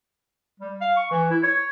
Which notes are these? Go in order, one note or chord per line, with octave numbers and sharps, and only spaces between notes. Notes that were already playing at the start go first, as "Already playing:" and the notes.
G3
F5
C#6
E3
E4
C#5